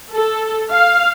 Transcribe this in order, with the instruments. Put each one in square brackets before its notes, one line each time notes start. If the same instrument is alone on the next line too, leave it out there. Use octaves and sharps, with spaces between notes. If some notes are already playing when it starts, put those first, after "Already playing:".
[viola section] A4
F5